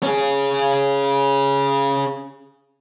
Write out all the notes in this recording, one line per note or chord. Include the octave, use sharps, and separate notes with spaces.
C#4 G#4